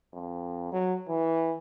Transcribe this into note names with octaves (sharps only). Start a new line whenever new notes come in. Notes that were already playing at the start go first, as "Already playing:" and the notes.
F2
F#3
E3